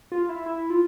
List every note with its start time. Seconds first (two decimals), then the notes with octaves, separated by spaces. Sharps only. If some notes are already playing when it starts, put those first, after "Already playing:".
0.12 F4
0.29 E4
0.46 E4
0.70 F4